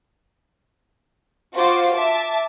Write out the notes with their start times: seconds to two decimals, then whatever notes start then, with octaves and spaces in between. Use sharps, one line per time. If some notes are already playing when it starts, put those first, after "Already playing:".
1.55 F4 F#4 C5 D6
1.94 E5 A5 D6